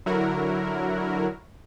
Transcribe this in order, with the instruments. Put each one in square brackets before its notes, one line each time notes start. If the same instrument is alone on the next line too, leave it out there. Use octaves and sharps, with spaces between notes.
[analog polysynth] D3 F#3 E4 F#4 A#4